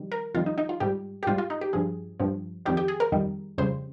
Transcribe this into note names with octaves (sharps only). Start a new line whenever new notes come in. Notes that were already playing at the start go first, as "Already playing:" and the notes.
Already playing: F2 D#3 G3
A#4
F2 D#3 G3 F4
D#4
D#4
F4
G#2 G3 G4
G4
G#2 G3 F4
F4
D#4
G4
G2 F3 G#4
G2 F3
F2 D#3 G3 G4
G4
G#4
A#4
F2 D#3 G3
F2 C#3 G3 C5